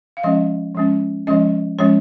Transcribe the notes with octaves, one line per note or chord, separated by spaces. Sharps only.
F5
F3 G#3 C#4 D#5
F3 G#3 C#4
F3 G#3 C#4 D#5
F3 G#3 C#4 C#5